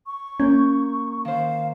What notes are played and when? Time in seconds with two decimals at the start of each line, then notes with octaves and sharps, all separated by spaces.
0.07 C#6
0.40 A#3 C#4 G6
1.25 D#3 C5 F5